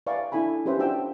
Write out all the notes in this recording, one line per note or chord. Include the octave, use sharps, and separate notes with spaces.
B4 D5 E5 F5 G#5 C#6
D4 E4 A4 G#5 B5
C#4 G4 B4 C5 E5
D4 F4 F#4 D5 G5 E6